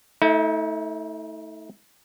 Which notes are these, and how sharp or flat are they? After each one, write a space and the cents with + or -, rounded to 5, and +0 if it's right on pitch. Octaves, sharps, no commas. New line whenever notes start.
A3 +0 D#4 +45